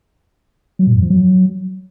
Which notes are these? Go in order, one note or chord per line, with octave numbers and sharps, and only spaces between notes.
F#3
A#2
F#2
F3
F#3